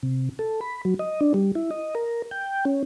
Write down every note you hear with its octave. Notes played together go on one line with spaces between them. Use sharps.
C3
A4
B5
F#3
D#5
D4
G3
E4
D#5
A#4
G5
C#4